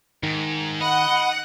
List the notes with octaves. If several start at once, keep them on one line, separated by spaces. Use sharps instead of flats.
G#2 D#3
D#5 F#5 B5